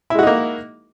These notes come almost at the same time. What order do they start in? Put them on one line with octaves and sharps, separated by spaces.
E4 G#3 F#4 D#4 A#3